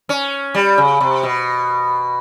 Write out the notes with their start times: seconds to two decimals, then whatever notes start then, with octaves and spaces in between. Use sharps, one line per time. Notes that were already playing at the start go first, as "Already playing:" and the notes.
0.09 C#4
0.54 G3
0.78 C#3
1.00 C3
1.23 B2